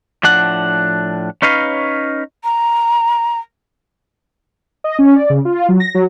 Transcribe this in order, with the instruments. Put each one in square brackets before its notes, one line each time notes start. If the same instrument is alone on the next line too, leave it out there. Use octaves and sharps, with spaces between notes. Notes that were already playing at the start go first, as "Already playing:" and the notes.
[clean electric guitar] A2 F3 D4 F#5
C#4 D#4 B4 C#5 F5
[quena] A#5
[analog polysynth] D#5
C#4
D5
C#3
F4
F#3
A#6
F#3